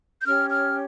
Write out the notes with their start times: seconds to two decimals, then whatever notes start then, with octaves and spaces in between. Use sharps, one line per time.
0.21 G6
0.26 C#4 G4 C#5 F6
0.50 F6